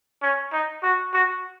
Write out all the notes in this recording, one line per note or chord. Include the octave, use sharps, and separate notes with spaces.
C#4
D#4
F#4
F#4